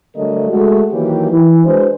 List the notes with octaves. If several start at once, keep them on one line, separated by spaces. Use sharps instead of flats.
D3 F#3 G3 A3 A#4 D#5
G#3 A3 F#4
D#3 E3 F#3 A#3 G4
E3
G#3 D4 F#4 B4 C5